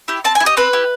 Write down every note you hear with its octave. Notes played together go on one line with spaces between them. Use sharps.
E4 G4
C4 A5
G#5
E4
G4 D#5
C4 B4
E4 G4